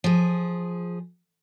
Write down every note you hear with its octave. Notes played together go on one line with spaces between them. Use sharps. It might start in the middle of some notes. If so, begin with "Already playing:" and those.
F3 G#4